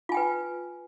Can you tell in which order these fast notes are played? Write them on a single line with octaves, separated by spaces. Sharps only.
F4 G#5 G5 B4